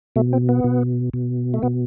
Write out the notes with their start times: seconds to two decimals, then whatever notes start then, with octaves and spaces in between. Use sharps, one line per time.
0.16 B2 A3
0.33 C4
0.49 B3
0.64 B2
1.14 B2
1.54 A3
1.63 B2 B3